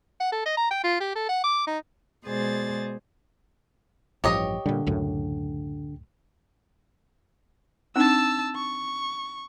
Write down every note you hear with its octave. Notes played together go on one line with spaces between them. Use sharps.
F#5
A4
D#5
A#5
G5
F4
G4
A4
F#5
D6
D#4
B2 G#3 G#4 C5 D5 A6
A1 G2 F3 G4 C#5 D#5
A#2 D3 G3
C#2 F#2 A2
C4 D4 D#4 A5 E6
C#6